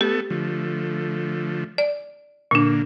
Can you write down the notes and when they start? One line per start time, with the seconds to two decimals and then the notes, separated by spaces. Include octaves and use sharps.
0.01 A3 B3 G4 A4
0.30 D3 F3 A3
1.78 D5
2.51 A#2 D3 A#3 D4